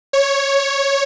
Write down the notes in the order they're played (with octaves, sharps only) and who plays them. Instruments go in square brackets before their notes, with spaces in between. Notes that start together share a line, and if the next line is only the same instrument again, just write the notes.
[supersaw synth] C#5